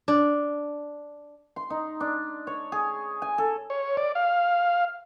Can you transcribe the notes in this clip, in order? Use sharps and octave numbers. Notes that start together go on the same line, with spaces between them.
D4
C6
D#4
D4
C#5
G#4
G#5
A4
C#5
D5
F5